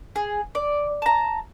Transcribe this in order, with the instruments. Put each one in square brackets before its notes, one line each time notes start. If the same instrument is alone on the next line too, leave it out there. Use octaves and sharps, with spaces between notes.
[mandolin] G#4
D5
A5 A#5